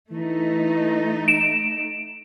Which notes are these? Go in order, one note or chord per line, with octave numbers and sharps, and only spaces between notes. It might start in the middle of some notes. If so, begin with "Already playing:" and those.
E3 A3 D#4
D7 E7